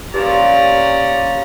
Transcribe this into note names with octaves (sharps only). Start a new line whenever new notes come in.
A#2 F3 C#4 G4 D5 G#5 A#5